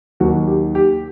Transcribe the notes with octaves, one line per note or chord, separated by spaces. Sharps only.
D#2 D#3 F#3 F#4
G4
G4